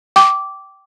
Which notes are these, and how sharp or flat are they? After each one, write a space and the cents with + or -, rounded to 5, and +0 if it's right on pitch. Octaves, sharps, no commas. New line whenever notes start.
G5 -15 D6 -10